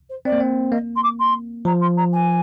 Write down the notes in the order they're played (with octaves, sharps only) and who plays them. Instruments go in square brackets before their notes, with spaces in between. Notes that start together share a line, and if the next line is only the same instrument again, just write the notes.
[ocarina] C5
[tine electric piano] C4 [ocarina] D5
[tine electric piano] A#3
C4
[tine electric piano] A#3 [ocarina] D#5
[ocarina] C6
D6
C6
[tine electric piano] F3 [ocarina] A#5
[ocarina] C6
A#5
G#5